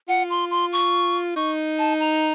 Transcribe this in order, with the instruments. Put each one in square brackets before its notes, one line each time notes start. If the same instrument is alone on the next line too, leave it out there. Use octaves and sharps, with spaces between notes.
[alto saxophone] F4 [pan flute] F#5
[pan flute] C6
C6
C#6
[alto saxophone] D#4 [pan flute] C#6
[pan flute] A5
A#5